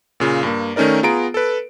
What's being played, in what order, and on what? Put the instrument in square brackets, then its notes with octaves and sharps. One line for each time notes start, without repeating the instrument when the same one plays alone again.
[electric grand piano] A#2 C#3 F4
G2 A#3
D#3 A3 C#4 D#4 A#4 D5
B3 F4 G#4 A#5 D7
A4 B4